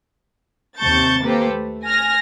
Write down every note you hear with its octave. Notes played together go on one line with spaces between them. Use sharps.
D#2 C3 A5 C#6 G6 A6
A#3 G4 A4 B4 C5
A3
G#5 F6 A#6